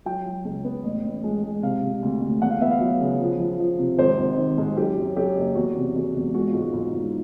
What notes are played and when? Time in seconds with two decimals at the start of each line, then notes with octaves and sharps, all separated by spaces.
0.05 F#3 G5
0.26 F#3
0.45 C#2
0.64 B3
0.84 A1
1.03 A1
1.24 G#3
1.43 G#3
1.62 C3 F5
1.82 C3
2.03 D2
2.22 D2
2.41 E2 F#5
2.51 F5
2.61 B3 E5
2.71 F5
2.81 F#3
3.00 C#3
3.20 F3
3.40 F3
3.60 F3
3.78 C3
3.98 G#1 C5
4.18 G#1
4.38 D#3
4.58 G#2
4.77 F#3 G4
4.97 F#2
5.16 F#2 G4
5.36 F#1
5.55 E2 F#4
5.76 C3
5.96 E2 F#4
6.15 E1
6.34 G#3 F#4
6.48 F4
6.54 G#2
6.62 F#4
6.74 G#2
6.93 G#2